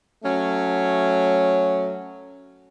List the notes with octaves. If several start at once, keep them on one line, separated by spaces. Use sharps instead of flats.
F#3 A3 C#4